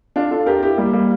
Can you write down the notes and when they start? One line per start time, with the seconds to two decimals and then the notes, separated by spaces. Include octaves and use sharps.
0.16 D4 F4
0.31 F4 A4
0.46 G4 A#4
0.62 E4 G4
0.78 G3 A#3
0.93 G3 A#3